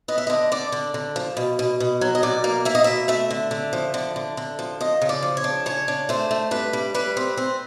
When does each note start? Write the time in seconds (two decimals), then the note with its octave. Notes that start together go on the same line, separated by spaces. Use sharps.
0.08 B3 D#5
0.18 E5
0.27 D3 D#5
0.52 D3 D5
0.72 D3
0.94 D3
1.16 F3
1.37 B2
1.59 B2
1.80 B2
2.01 F#3
2.15 D#5
2.23 B2 D5
2.44 A#3
2.65 A#3 E5
2.75 D#5
2.84 B2 E5
3.08 A3 E5
3.31 D3
3.51 D3
3.73 F3
3.94 D3
4.16 D3
4.37 D3
4.59 F3
4.81 F3 D#5
5.02 C#3
5.09 D5
5.23 F3
5.37 C#5
5.44 D4
5.66 C#3 C#5
5.88 D4
6.09 A3 C5
6.31 A3
6.51 G2 B4
6.73 G3
6.94 G3 B4
7.17 C4
7.37 C4